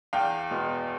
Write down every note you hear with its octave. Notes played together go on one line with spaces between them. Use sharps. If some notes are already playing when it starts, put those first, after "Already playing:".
E2 F5 G5
B2 G#3 B3